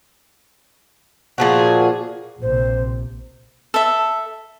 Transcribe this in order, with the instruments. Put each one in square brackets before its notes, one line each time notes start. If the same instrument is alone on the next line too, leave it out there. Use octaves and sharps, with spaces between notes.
[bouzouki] A#2 F3 F#4 [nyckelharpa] G#4
[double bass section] A#1 C3 [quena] C5
[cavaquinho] A4 E5